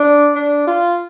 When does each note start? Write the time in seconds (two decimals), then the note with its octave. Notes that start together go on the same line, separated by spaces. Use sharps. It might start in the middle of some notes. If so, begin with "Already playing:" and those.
Already playing: D4
0.35 D4
0.67 F4